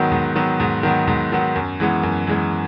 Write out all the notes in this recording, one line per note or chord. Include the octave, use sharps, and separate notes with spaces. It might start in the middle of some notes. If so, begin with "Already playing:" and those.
Already playing: G#2 D#3 F#3 B3
G#2
D#3 F#3 B3
G#2
D#3 F#3 B3
G#2
D#3 F#3 B3
F#2
E3 G#3 B3
F#2
E3 G#3 B3